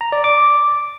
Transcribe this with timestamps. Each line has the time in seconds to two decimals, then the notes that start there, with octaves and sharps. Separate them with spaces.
0.01 A#5
0.12 D5
0.24 D6